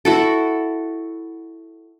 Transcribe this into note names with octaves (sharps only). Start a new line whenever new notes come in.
E4 F#4 A4